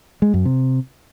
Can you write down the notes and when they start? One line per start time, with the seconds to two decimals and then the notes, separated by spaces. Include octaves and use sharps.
0.22 G#3
0.34 F#2
0.45 C3